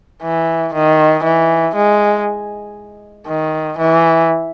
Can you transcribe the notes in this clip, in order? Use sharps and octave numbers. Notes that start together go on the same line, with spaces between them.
E3
D#3
E3
G#3
D#3
E3